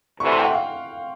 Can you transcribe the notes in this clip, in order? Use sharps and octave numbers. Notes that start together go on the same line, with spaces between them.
D2 C3 E3 C#6
C6
G5
F#5
F5